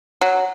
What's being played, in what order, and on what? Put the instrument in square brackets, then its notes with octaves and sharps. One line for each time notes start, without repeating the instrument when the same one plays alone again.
[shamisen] F#3